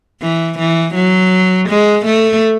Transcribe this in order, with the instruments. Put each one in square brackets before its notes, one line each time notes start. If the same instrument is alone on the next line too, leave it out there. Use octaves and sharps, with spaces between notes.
[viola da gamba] E3
E3
F#3
G#3
A3